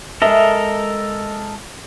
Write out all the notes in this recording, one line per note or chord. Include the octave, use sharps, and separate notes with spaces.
G#3 A4 A#4 D#5 E5